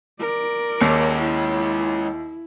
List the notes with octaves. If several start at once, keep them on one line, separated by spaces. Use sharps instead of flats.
A#4 D5
D#2 G#3 C#5
E4